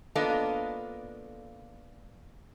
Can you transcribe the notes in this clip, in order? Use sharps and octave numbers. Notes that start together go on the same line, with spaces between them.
A#3 B3 D4 F4 A4 D#5